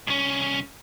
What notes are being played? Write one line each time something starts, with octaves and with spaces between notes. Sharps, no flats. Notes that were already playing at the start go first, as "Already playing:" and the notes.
C2 C#4